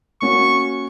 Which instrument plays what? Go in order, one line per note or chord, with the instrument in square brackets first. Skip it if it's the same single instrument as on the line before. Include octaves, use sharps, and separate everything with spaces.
[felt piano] A#3 C#4 F#4 [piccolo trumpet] C#6